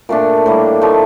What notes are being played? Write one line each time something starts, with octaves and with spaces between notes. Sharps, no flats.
A#2 A3 D4
A2 G3 A#3
D3 F3 A3 D#4